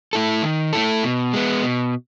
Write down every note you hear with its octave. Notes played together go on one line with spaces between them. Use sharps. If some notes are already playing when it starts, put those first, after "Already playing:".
A3 E4 A4
D#3
A3 E4 A4
B2
G#3 B3
B2